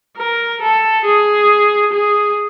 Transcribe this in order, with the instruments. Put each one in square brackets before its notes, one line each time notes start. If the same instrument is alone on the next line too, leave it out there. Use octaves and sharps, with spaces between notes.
[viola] A#4
A4
G#4
G#4